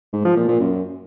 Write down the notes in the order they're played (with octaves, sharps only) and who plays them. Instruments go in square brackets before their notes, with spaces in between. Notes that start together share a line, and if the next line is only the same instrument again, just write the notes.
[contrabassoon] G#2
F3
A#2
A#2
F#2